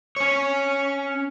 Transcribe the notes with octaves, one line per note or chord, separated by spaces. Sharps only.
C#4 C#5